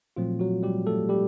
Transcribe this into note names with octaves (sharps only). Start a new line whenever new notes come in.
A#2 F3 F#3 A3 C4 F4
F#3 F#4
G3 G4
A3 A4
G3 G4